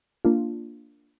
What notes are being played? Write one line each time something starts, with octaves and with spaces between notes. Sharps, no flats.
A#3 D4 F4